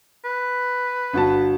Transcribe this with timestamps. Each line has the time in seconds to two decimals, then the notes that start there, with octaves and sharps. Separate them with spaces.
0.25 B4
1.13 G1 F#4 A5